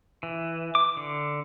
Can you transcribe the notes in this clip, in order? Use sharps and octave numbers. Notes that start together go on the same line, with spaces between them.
E3
D6
D3